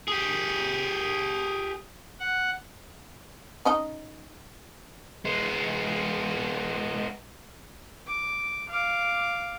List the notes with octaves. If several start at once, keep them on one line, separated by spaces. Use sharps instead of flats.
G4 G#4
F#5
C#4 D#4 D#5
G#3 B3
D6
F5 D6